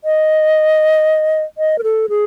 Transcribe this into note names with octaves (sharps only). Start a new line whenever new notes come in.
D#5
D#5
A#4
A4
G#4